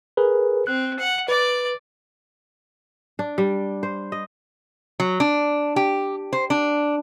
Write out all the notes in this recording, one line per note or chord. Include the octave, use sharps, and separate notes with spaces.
G#4 A#4 B4
C4 F#6
F#5
B4 D5
D4
G3
C5
D#5
F#3
D4
G4
C5
D4